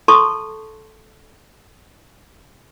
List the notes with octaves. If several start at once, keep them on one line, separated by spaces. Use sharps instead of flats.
A4 A5 C6 C#6